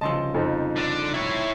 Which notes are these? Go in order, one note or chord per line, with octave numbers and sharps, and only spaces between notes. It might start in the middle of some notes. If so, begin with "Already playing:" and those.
C2 C#3 F3 D#5 A5 C6 E6
F2 C4 D#4 F4
D3 D4
E4 C#5